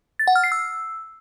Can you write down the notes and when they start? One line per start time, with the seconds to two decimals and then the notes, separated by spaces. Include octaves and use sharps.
0.19 A6
0.27 F#5
0.36 F6
0.44 C7
0.52 E6